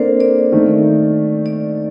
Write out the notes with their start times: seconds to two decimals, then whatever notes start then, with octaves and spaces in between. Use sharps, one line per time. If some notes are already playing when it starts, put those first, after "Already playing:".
Already playing: A#3 C4 D4 A4 A#4 C5 D5
0.20 D5
0.52 D#3 A3 D#4
1.46 D5